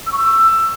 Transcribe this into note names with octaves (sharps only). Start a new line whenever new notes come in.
E6
C#6
E6